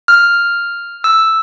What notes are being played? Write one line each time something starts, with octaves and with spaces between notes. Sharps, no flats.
F6
E6